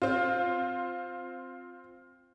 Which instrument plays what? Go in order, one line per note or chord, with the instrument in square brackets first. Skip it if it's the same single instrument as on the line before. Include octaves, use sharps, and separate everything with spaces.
[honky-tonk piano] C4 F4